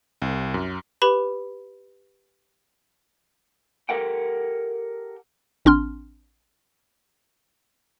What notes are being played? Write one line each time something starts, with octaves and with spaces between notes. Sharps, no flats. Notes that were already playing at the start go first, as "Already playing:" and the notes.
C2
F#2
G4 B4 B5
G4 A4 A#4 F#5 G5
A1 C4 D4 C6 F6